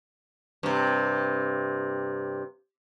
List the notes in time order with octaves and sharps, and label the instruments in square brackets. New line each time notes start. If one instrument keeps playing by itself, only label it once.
[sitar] G2 C3